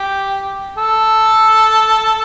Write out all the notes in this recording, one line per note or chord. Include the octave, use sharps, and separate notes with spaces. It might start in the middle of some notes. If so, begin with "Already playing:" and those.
Already playing: G4
A4